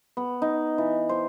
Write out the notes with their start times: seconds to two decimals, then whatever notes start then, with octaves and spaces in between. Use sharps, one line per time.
0.17 B3
0.42 D#4
0.78 E3
1.09 C5